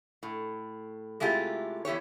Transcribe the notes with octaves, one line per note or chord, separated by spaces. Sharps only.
A2
C3 G#3 A3 E4 F4 G4
E2 E4 G4 C#5